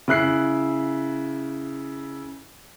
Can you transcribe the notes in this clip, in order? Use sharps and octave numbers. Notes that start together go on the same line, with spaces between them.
C#3 E4 F#6 C7